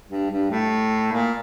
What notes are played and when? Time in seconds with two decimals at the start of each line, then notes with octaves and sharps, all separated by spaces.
0.10 G2
0.30 G2
0.50 A2
1.12 A#2